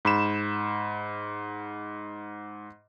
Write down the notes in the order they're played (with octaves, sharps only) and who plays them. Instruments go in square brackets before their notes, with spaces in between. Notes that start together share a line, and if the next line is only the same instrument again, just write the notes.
[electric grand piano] G#2 B5 E7